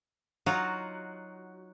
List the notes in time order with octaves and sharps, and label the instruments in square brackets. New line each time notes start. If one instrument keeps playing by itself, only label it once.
[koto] F#3 D#4 F4 F#4